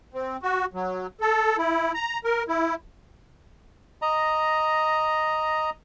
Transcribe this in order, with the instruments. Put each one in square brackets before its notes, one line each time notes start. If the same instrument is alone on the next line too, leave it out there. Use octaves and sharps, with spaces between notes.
[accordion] C4
F#4
F#3
A4
E4
A#5
A#4
E4
[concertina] D#5 A#5